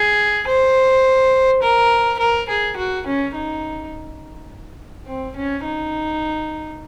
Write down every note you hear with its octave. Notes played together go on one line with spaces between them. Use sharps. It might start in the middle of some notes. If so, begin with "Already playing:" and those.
Already playing: G#4
C5
A#4
A#4
G#4
F#4
C#4
D#4
C4
C#4
D#4